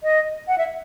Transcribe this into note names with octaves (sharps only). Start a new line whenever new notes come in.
D#5
F#5
E5